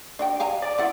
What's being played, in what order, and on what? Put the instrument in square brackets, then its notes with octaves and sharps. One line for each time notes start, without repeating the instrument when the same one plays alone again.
[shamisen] D4 D#4 G5
F5 G#5 A#5
[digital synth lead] D5
[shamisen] C#3 E4 F#5